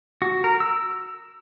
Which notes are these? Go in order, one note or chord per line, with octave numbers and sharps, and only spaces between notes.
F#4
A#4
E6